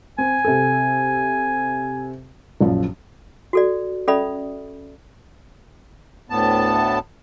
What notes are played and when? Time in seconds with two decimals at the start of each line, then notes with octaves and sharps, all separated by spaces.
0.18 C4 G#5
0.45 C3 A4
2.61 A#1 F#2 F3
3.53 F#4 A4 D5
4.08 C#4 A4 D5 E5 B5 D#6
6.30 D2 A2 B3 A5